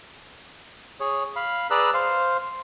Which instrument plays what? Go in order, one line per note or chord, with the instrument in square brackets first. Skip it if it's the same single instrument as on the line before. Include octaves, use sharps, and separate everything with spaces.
[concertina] G#4 C#5
F5 B5
G#4 B4 D5 A#5 E6 F#6
C5 F5